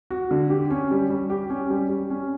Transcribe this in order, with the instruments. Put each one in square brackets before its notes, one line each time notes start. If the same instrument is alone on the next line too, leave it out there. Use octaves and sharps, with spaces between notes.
[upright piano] F#4
D3
G4
C#4
G3
G3
G4
C#4
G3
G3
C#4